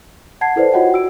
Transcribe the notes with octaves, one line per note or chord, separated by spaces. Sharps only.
F#5 A5 G#6 C7
E4 A4 B4 C5 D5
F4 F#4 C#5 D#5 F#5 G5
F#4 E6 D7